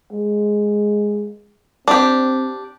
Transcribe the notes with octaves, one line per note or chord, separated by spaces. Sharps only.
G#3
C4 D4 G4